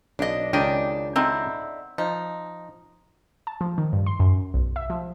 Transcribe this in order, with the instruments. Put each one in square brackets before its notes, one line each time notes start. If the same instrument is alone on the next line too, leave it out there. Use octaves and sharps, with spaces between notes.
[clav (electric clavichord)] B1 [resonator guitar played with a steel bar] D4 D#5
[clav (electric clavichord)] C#2 D#3 D#5 [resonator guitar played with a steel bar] D4 [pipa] G4
[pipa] D3 D#4 E4 [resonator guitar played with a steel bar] C4
[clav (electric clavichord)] F3 [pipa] D#4
[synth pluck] A5
F3
D#3
G2
C6
F#2
B1
E5
F3